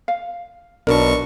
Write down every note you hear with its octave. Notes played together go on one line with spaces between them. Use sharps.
F5
B1 B2 D4 A#4 A5 C#6